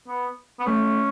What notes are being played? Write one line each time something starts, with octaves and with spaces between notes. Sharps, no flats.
B3
B3
A3 C#4